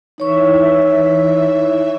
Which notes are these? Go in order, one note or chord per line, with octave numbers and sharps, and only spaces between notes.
E3 D#4 C#5 E5 C#6